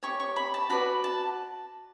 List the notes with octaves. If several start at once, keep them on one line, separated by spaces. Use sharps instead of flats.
G4 C#5 C#6
C#6
B5
A5
F#4 B4 D5 B5
A5